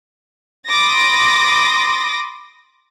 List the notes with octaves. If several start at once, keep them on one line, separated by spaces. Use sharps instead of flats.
B5 C6 D6 D#6 A6 A#6